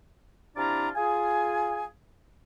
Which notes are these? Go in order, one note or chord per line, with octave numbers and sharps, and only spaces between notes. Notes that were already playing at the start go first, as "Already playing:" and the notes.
C3 D4 E4 F4 D5 A#5
F4 G#4 G#5